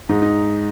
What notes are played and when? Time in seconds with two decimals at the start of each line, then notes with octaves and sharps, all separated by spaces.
0.09 G#2 D#4
0.22 D#4